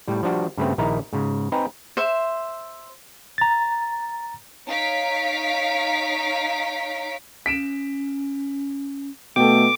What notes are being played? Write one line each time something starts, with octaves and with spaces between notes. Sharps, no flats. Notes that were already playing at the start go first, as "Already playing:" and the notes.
A2 G3
F3 G3 D4 F#4
G2 C#3 A3 B3 C4
A#1 D#3 D#4 E4 A#5
G#2 C#3
C4 D#4 B4 G5 G#5 A#5
C5 E5
A#5 A6
D#4 C#5 F5 B6 D7
C#4 B6 D7 E7
B2 A3 A4 G5 D6